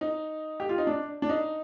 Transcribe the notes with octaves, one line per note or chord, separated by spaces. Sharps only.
D#4
G4
F4
D#4
D4
D4
D#4